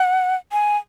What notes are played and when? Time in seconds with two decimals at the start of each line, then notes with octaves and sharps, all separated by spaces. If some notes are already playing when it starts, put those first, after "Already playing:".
Already playing: F#5
0.52 G#5